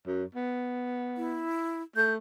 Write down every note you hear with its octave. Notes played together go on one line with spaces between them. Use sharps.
F#2
B3
E4
A3 G6